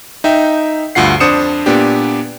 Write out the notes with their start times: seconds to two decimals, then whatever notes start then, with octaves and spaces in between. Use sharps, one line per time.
0.24 D#4 E5 G5
0.95 D2 G2 F4 F#5 C7
1.20 F2 D4 C5 D#6 C#7 E7
1.66 A#2 B3 D4 G4